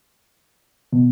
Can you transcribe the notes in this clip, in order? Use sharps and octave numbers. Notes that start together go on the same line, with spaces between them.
B2